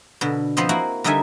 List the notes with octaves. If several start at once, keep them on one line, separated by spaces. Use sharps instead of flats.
B2 D3
F3 B3 C4 C5 D#5
A#3 E4 F#4
D3 G3 D#4 A#4 E5 G#5